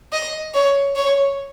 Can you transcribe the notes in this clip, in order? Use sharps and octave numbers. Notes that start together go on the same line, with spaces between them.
D#5
C#5
C#5